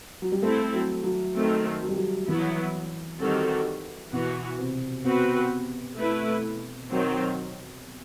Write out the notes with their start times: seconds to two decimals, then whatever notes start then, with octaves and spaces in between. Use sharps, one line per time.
0.22 F#3
0.32 G3
0.42 A3 C4 E4 A4
0.74 F#3
1.04 F#3
1.35 D#3 A3 C4
1.81 F#3
1.88 G3
1.96 F#3
2.28 E3 F#3 B3 E4
3.20 D#3 G3 C4 F#4 A4
4.12 B2 E3 B3 F#4
4.59 C3
5.05 B3 C4 F#4 B4
5.97 A3 E4 B4
6.90 D#3 F#3 C4